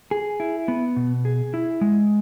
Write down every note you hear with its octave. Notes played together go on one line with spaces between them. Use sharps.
G#4
E4
B3
B2
G#4
E4
G#3